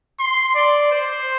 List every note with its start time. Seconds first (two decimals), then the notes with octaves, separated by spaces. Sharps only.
0.20 C6
0.55 D5
0.92 C5